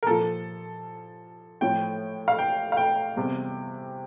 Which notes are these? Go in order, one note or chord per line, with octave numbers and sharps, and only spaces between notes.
A#4
A#2 F3 A4
A2 F3 G5
F5
G5
F5
G5
E2 C3 G3